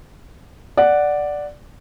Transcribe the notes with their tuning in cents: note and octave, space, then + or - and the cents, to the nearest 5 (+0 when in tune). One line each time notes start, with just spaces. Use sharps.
D5 +0 F#5 +0